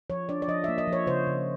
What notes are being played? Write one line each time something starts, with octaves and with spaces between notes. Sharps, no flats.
F3 C#5
D4 D5
D5
F3 D#5
E5
A#3
D#5
F3 C#5
C#3 C5
C#3